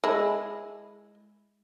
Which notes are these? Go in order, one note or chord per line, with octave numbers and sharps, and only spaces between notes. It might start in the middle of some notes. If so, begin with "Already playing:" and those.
G#3 E4